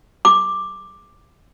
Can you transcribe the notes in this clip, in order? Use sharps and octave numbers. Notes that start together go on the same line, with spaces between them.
D6